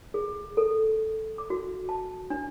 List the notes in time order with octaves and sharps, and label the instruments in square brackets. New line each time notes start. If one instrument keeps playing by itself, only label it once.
[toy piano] G#4
A4
D6
F#4
A5
D4